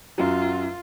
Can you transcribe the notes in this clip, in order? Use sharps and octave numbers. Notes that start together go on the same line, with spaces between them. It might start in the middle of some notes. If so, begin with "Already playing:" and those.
F#2 F#3 F4